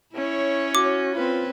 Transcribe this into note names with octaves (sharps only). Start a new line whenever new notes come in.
C#4 E4 C#5
F#4 D6
C4 F4 B4